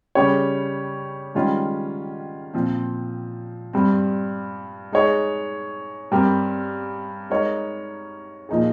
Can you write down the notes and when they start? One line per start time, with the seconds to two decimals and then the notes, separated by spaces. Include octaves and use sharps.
0.15 C#3 G3 C#4 G4 C#5
1.35 G#2 D#3 G3 C#4 F4
2.54 A#2 F3 C4
3.73 G2 G3 C4
4.92 G#3 D#4 G#4 C#5
6.11 G2 G3 C4 G4 A#4
7.30 G#3 D#4 A#4 C#5
8.49 A#2 F3 A#3 D#4 G#4